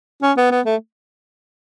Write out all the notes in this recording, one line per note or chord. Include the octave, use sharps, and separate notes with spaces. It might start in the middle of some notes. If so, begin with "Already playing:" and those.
C#4
B3
B3
A3